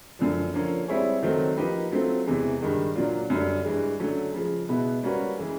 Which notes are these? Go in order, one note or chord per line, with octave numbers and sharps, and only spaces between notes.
F#2 D3 F3
D3 F3 A#3 C#4
G3 C4 E4 G#4 C#5
D#3 F#3 A3 C4 D#4
F3 A#3 D#4 G4 B4
F#3 A3 C4 F4
E2 C3 E3 G#3
G2 D#3 G#3
A#2 F#3 A#3 D4 F4
F#2 D3 G3
G2 E3 G#3
D3 F#3 A3 C#4
C#3 F3 G#3
B2 G#3 B3 E4
G3 A#3 C#4 F#4 B4
C#3 E3 G#3